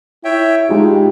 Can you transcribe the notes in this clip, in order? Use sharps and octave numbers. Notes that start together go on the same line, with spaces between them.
E4 C#5 E5 G5
A2 G#3 D#4 F4 G4